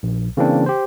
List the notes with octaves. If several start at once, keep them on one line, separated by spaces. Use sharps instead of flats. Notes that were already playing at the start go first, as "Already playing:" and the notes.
A#1
C#3 E3 A#3 C4 D4
G4 C5